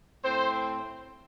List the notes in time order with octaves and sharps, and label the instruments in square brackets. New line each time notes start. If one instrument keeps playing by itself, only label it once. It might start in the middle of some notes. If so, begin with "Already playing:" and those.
[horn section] A2 A3 C4 C5